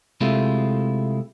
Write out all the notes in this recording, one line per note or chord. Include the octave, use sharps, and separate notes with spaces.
C3 G#3 A3 E4 F4